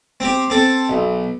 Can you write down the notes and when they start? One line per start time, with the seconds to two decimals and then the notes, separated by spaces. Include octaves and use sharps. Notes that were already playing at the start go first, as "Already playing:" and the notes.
0.20 C4 G4
0.50 C4 A4
0.89 B1